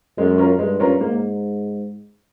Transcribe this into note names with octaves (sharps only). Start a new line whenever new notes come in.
F#2 G#3
C#4 F4 A#4
G2 G#3
C#4 F4 A#4
G#2 A#3